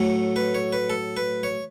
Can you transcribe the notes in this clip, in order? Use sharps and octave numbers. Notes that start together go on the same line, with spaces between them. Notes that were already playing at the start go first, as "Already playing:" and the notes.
Already playing: A2 F#3 A3
B4
C#5
B4
A4
B4
C#5